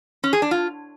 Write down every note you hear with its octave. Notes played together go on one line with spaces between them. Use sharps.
C#4
G#4
D4
F4